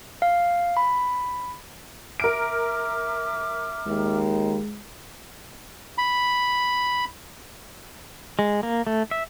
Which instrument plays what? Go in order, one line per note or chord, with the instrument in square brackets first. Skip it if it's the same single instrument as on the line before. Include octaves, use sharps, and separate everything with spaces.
[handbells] F5
B5
[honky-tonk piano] A#4 D7 [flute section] E5 D6 F6
[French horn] D#2 [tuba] G#3
[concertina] B5
[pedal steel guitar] G#3
A#3
A3
E5